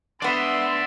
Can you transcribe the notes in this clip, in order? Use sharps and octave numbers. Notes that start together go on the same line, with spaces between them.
B3 D4 D5 E5 F#5 C6